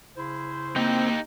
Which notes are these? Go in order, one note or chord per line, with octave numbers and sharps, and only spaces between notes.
C#3 E4 C5
A#3 C4 D#4 G4